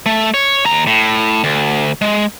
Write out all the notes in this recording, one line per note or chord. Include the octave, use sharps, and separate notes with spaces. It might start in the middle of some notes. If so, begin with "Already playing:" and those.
A3
C#5
D#2 A#5
A2
D2
G#3